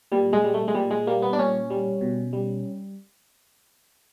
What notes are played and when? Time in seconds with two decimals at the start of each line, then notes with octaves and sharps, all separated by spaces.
0.12 A#2 G3
0.33 G#3
0.44 G3
0.54 A3
0.68 G#3
0.75 A#2 G3
0.91 G#3
1.07 G3 A#3
1.22 B3
1.33 D4
1.38 A#2 C#4
1.70 G3
2.01 B2
2.33 G3